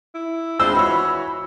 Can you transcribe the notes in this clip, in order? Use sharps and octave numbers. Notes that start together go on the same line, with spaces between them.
E4
G#3 D4 F4 C5 B5 E6
E3 F#4 C#5